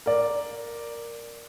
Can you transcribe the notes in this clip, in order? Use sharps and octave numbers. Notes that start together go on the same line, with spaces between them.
A#4 D5